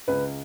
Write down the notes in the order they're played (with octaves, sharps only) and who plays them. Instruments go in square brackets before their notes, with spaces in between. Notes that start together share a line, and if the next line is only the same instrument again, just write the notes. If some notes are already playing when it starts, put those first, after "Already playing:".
[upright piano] C#2 B4